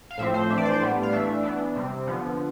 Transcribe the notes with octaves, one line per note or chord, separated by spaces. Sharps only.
F5
A2 F3 C4 E5
C5
E3 A3 D4 E5
D5
C5
D5
A2 G3 B3 D4
F5
E3 A3 D4 E5
E3 B3 D4
C3 G3 C4
D3 F3 B3